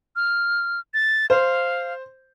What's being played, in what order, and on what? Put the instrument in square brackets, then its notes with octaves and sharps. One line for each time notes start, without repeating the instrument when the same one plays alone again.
[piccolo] F6
A6
[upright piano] C5 [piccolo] F5